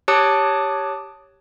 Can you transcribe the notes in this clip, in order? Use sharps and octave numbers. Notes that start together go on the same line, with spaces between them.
G4 C#5 A5 D6 D#6 F#6